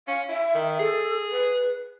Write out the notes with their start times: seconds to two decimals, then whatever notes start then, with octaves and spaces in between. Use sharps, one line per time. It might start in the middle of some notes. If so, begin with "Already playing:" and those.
0.08 C#4 F5
0.29 E4 E5
0.54 D#3
0.79 G#4 A4
1.31 B4